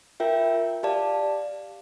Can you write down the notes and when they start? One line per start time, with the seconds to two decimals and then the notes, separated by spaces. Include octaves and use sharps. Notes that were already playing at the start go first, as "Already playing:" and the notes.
0.20 F4 A#4 E5 G5
0.83 G4 D5 F5 A5